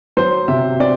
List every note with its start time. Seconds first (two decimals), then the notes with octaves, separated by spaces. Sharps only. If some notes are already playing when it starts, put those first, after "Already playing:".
0.17 F#3 C5
0.48 C3 E5
0.80 C4 D5